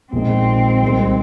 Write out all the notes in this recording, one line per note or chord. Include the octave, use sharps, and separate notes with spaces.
A#1 A#2 G#3 C4 D#4
C2 C3 D#3 G#3